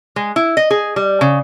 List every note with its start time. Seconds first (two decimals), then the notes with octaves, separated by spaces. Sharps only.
0.16 G#3
0.36 E4
0.57 D#5
0.71 G#4
0.96 G3
1.21 C#3